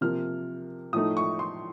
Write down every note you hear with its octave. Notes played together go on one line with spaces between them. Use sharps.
C3 F3 A#3 F6
A2 F3 A3 D#4 D#6
C#6
C6